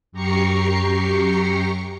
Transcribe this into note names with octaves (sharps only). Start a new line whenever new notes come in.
F#2 G4 A#5 C#6 C7 C#7